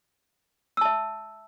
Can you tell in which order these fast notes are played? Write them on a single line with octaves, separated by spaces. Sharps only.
E6 A5 E5